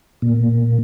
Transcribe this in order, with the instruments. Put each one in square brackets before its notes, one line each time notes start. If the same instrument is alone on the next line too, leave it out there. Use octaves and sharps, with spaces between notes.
[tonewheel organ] A#2